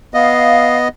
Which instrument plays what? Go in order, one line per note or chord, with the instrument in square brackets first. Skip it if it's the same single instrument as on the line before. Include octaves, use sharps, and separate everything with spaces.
[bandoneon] B3 D#5 [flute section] F5